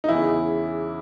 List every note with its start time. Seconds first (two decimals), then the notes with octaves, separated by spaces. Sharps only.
0.04 D#4
0.09 E2 C#3 E3 E4